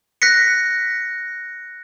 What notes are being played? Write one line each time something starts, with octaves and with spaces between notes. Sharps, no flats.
F#6 A#6 B6 C#7